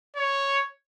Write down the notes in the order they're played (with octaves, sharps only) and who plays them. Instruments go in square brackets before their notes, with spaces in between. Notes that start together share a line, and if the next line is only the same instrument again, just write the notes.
[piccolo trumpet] C#5